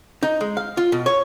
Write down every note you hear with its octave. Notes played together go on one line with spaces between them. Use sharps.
D#4
G#3
F5
F4
B2
C#5